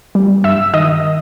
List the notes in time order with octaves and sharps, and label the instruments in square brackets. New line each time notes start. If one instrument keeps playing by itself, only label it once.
[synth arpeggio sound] G3
G2 E5 E6
D#3 D#5 D#6